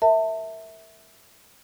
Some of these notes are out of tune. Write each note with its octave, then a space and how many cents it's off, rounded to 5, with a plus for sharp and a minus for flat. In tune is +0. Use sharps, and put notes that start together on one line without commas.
A#4 -10 E5 -15 A5 +35